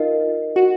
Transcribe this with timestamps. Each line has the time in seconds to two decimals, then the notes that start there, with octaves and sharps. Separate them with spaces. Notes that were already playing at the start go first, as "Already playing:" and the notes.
Already playing: D#4 F4 A#4 D#5
0.56 F#4